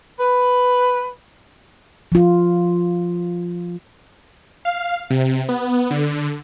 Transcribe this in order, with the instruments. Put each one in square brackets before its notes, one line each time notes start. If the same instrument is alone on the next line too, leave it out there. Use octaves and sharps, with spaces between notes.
[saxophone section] B4
[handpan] F3 F4
[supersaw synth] F5
C3
B3
D3